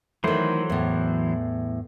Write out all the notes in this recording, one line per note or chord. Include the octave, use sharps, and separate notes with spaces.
D#3 E3 F#3 A3 C5
E2 A2